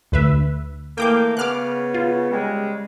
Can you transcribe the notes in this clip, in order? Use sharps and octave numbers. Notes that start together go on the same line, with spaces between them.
D2 B4 E5
E3 A3 A#3 G5 D6 G6
C#3 B3 D6 F6 F#6
F4
C#3 G3 G#3